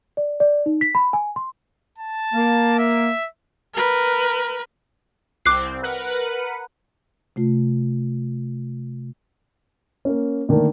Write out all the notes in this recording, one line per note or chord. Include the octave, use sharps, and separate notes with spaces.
D5
D5
D#4
B6
B5
G#5
C6
A5
A#3
E5
A#4 B4
C2 C4 D6 F#6 C7
A#4 B4 F#5
C3 A3 F4
A#3 C#4
D3 D#3 A3 A#3 D4